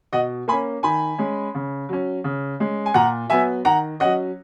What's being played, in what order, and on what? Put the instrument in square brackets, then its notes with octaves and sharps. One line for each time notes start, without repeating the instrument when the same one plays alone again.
[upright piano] B2 D#5 F#5
A#3 G#5 B5
C#4
D#3 G#5 B5
G#3 C#4
C#3
F#3 C#4
C#3
G#3 C#4
G#5
A#2 F#5 A#5
F#3 B3 E5 G#5
D#3 F#5 A#5
F#3 C#4 D#5 F#5